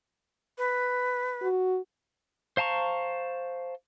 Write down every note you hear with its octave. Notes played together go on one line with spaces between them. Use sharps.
B4
F#4
C5 F5 A5 A#5 C#6